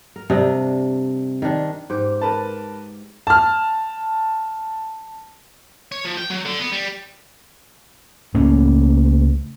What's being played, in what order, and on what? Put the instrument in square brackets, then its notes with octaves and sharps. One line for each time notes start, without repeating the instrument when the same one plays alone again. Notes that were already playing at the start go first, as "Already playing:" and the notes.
[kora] A#4
G2 C3 D4 D#5
D#3 D4
G#2 G4
[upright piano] A#4 B4 A5
A5 F6
[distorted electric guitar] C#5
F3
G5
F#3
D3
B3
G3
[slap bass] C#2 A2 A#3 C#4